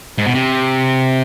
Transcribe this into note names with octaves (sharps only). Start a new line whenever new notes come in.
G#2
B2
C3